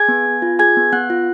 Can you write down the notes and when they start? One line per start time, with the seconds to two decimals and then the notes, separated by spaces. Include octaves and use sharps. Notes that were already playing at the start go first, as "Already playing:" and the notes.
Already playing: G#4 G#5 G#6
0.09 B3
0.26 B3
0.42 F4
0.59 G#4 G#5 G#6
0.77 B3
0.92 B3 F#5 F#6
1.10 F4